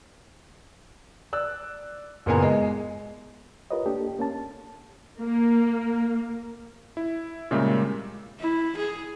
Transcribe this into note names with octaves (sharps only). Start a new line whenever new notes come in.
D5 E6 F#6
F#1 A#2 A#3 B3 G#5 A#5
G#3
F4 G4 A#4 B4 C#5 D#5
A#3 D4 G4 A4
A#3 C#4 A5
A#3
E4
A#2 C#3 G3 G#3 A#3 E5
E4
G#4